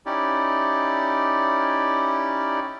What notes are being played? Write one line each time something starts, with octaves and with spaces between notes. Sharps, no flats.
C#4 D#4 E4 G4 D5